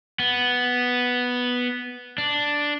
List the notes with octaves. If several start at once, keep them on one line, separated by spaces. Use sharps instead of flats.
B3
D4